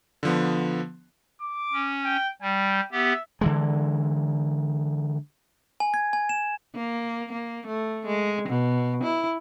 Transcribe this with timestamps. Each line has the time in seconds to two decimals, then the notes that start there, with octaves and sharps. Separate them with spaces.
0.23 D3 F3 B3
1.41 D6
1.73 C#4
2.04 G5
2.42 G3 G5
2.92 B3 G4 E5
3.41 D3 E3 G#3
5.80 G#5
5.94 G#6
6.13 G#5
6.29 E7
6.75 A#3
7.33 A#3
7.67 A3
8.06 G#3
8.49 B2
9.04 E4